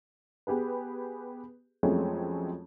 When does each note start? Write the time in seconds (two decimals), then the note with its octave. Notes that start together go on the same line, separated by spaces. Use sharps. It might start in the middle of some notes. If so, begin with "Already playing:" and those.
0.47 B3 G4 G#4 B4
1.83 F2 F#3 G#3 A3 C4 C#4